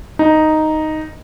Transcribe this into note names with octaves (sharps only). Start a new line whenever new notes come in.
D#4